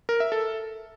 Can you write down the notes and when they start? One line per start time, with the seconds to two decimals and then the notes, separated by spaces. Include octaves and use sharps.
0.09 A#4
0.20 E5
0.32 A4